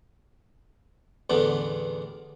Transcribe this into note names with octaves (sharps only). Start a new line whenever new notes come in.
A1 E2 D3 B3